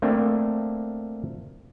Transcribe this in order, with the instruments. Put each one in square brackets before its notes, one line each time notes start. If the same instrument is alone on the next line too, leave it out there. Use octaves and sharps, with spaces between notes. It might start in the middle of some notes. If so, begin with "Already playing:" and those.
[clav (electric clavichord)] A3 A#3 C4 D4